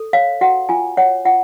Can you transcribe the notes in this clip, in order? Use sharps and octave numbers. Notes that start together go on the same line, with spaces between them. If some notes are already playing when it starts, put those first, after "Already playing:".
Already playing: A4
C#5 F5
F#4 F#5
F4 G#5
C#5 F#5
F4 F#5